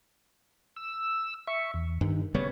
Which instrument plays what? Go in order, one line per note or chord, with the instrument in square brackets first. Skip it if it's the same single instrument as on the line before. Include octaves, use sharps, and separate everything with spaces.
[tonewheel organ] E6
E5 C#6
E2
[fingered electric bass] G2 [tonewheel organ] D#3
[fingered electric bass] C#3 G3 B3 [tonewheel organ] C#5